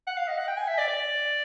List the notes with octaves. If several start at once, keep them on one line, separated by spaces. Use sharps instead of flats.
F#5
F5
D#5
F#5
G5
G#5
E5
D5
D5